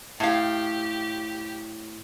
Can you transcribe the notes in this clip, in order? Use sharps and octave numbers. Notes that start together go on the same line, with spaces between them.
A2 G4 F5